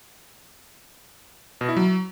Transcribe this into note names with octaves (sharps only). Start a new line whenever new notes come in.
B2
E4
F#3